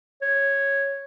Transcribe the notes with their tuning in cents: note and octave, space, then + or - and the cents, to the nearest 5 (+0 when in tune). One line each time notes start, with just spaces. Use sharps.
C#5 -5